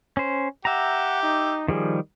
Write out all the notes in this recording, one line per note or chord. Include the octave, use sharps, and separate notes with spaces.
C#4 C5
G4 E5 F#5 A#5
D#4
D#3 F3 G3 G#4